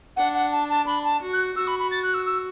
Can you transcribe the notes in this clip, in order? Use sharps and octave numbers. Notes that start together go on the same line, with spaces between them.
D4 F#5
F#5
A5
A5
D4 B5
A5
F#4
F#6
F#4 E6
B5
B5
A6
F#6
E6
E6